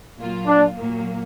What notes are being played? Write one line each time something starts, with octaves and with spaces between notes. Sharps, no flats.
A#2 F#3 A#3 F4
D4
A#2 F#3 A#3